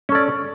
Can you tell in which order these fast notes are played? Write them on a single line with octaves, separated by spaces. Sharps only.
C#4 A4 D5